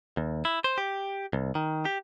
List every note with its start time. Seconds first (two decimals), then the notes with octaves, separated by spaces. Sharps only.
0.17 D#2
0.45 E4
0.64 C5
0.78 G4
1.33 C2
1.55 D#3
1.85 G4